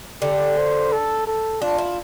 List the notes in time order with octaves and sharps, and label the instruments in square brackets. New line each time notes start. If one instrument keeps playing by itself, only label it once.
[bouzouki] D3 [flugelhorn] G4
[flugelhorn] C5
A4
A4
[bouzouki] D4 [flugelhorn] F4
[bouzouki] E4